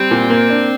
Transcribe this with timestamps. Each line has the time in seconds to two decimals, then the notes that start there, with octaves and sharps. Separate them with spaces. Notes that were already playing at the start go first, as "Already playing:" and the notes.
Already playing: G3 C4
0.11 A#2
0.30 A#3
0.50 D4